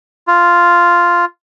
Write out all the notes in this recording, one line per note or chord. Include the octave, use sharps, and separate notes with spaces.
F4